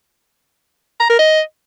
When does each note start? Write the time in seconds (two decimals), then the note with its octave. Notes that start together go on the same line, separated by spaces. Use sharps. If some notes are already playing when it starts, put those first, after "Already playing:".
1.00 A#5
1.09 A#4
1.19 D#5